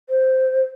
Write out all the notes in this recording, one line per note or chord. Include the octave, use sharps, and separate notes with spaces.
C5